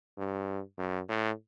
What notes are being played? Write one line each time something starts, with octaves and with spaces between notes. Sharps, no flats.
G2
F#2
A2